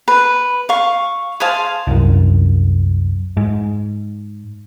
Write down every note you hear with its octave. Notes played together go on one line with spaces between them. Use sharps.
B4
F5 C#6
G#4 C5 F5 A5
C2 F#2
G#2